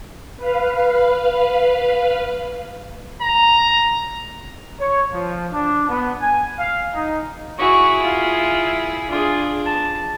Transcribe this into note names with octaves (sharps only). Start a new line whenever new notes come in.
B4 F5
A#5
C#5
F3
D4
B3
G#5
F5
D#4
E4 F#4 G#4 C#6
F4 F5
D4 F4 G#4
A5